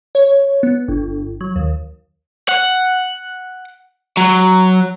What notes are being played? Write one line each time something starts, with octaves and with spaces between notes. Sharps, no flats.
C#5
B3
G1
F#3
D#2
F#5
F#3